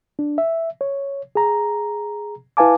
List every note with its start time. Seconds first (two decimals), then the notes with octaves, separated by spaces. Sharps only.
0.19 D4
0.38 E5
0.81 C#5
1.35 G#4 A#5
2.57 E4 B4 F5 G#5 A5 D6